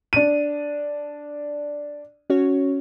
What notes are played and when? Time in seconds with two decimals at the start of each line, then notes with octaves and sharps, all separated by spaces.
0.13 D4 D#7
2.30 C#4 F#4 C#5